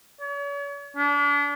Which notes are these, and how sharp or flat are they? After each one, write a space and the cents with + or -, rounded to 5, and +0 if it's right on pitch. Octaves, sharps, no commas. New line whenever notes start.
C#5 +40
D4 -35